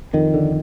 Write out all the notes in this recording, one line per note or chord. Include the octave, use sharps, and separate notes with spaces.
F2 D#3
D3